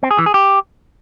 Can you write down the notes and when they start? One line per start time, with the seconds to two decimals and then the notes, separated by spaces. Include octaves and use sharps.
0.03 C4
0.11 G#4
0.18 E3
0.26 G#4
0.34 G4